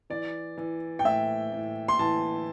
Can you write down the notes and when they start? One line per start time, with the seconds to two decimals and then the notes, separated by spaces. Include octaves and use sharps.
0.10 E3 D5
0.58 E3
0.99 G5
1.04 A2 E5
1.52 A2
1.88 C6
1.99 E3 A5